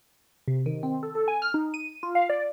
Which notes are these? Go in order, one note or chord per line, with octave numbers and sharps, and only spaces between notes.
C3
D#3
C4
A4
A4
G#5
F6
D#4
D#7
F4
F5
D5